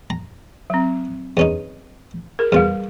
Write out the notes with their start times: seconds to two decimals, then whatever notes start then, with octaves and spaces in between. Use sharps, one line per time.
0.10 A#5
0.70 F#3 C4
1.37 E2 C#4 D#4
2.39 G#4 A#4
2.52 E2 G3 F4 G#4